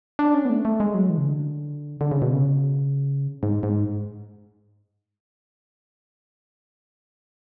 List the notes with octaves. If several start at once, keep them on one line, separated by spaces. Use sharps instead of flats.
D4
C#4
B3
A3
A3
G#3
F#3
E3
C#3
D3
D3
C#3
B2
C#3
G#2
G#2